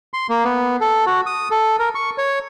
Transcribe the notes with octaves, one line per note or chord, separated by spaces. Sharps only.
C6
A#3
B3
A4
F#4
D#6
A4
A#4
C#6
C#5